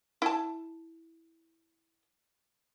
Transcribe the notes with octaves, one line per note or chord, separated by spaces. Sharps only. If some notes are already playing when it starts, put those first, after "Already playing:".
E4 A5